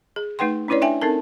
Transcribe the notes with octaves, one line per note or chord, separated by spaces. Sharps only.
G#4
A3 D#4 B4 F#5 G5 C6
C#4 D4 E4 B4 C#5 D5
D4 E5 G5 G#5
C4 D#4 A4 A#4 A5